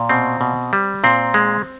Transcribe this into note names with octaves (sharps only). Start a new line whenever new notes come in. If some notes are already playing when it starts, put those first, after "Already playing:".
Already playing: A#2
B2 C4
B2
G3
A#2 C4
G#3